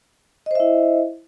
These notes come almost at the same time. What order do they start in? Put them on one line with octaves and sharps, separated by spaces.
D#5 C5 E5 E4